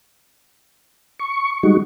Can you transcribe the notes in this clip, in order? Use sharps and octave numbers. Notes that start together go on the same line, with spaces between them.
C#6
G3 G#3 D#4 F#4